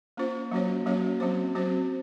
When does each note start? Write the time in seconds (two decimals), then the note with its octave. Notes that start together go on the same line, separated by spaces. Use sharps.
0.17 A#3 C#4 F4 C5
0.51 F#3 A#3 C#4 F#4 C#5
0.86 F#3 A#3 C#4 F#4 C#5
1.20 F#3 C4 F#4 C5
1.55 F#3 C4 F#4 C5